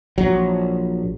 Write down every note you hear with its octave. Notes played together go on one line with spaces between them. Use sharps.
A#1 F#3